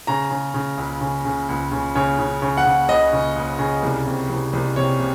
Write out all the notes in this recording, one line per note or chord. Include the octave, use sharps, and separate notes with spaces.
C#3 A#5
C#3
C#3
C#2
C#3
C#3
C#2
C#3
C#3 C#5
C#3
C#3
F#5
C#3
C#2 D#5
C#3
C#2
C#3
C2
C3
C2
C2
C3 C#5
C3